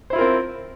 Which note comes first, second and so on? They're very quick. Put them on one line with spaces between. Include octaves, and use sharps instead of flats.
C5 E4 F4 A#4 C4